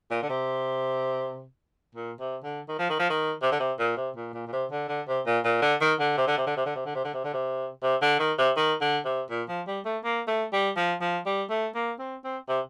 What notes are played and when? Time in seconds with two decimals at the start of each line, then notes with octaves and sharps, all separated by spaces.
0.11 A#2
0.23 D3
0.29 C3
1.95 A#2
2.20 C3
2.44 D3
2.68 D#3
2.79 F3
2.90 D#3
2.99 F3
3.10 D#3
3.42 C3
3.52 D3
3.60 C3
3.79 A#2
3.97 C3
4.16 A#2
4.33 A#2
4.47 A#2
4.52 C3
4.71 D3
4.88 D3
5.08 C3
5.26 A#2
5.44 A#2
5.62 D3
5.81 D#3
6.00 D3
6.17 C3
6.27 D3
6.37 C3
6.46 D3
6.57 C3
6.66 D3
6.75 C3
6.86 D3
6.95 C3
7.04 D3
7.14 C3
7.24 D3
7.33 C3
7.83 C3
8.02 D3
8.19 D#3
8.38 C3
8.57 D#3
8.81 D3
9.05 C3
9.30 A#2
9.48 F3
9.67 G3
9.85 A3
10.04 A#3
10.27 A3
10.53 G3
10.76 F3
11.01 F3
11.26 G3
11.50 A3
11.75 A#3
11.99 C4
12.24 C4
12.49 C3